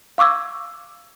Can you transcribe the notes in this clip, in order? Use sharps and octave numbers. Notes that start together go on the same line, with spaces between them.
F5 C#6 D6 E6 G#6